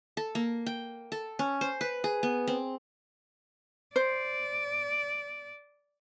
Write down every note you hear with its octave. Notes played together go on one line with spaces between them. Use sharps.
A4
A#3
G5
A4
C#4
C5
B4
G#4
B3
C4
C5 D5